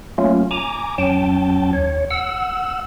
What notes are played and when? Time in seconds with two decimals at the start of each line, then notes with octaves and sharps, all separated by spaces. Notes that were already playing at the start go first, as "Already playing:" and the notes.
0.18 F#3 A3 A#3 C#4 F4
0.51 G#5 A#5 D6
0.98 F2 F#3 C#4 G5 A5
1.73 D#2 C#5
2.10 F#5 E6